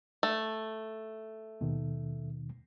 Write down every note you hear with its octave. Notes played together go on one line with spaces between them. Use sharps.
A3
D#2 B2 D#3